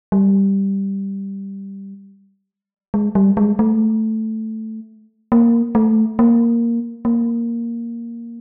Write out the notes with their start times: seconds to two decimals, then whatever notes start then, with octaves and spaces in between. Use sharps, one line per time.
0.12 G3
2.94 G#3
3.15 G3
3.37 G#3
3.59 A3
5.32 A#3
5.75 A3
6.19 A#3
7.05 A#3